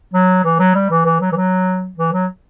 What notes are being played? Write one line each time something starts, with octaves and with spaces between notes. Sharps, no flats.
F#3
E3
F#3
G3
E3
E3
F#3
E3
F#3
E3
F#3